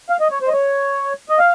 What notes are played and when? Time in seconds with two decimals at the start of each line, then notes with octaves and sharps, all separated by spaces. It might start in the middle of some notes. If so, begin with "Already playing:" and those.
0.09 F5
0.20 D#5
0.31 C#5
0.42 C5
0.48 D#5
0.53 C#5
1.29 D#5
1.39 F5